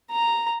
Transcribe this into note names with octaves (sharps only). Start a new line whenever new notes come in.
A#5